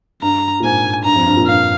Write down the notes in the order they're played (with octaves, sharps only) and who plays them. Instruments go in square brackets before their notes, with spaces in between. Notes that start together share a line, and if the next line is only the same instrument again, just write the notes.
[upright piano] G2 [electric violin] A#5
[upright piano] A#2
[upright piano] G#2 [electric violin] G#5
[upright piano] G2 [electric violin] A#5
[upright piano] F2
G2
A#2
[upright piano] G2 [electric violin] F5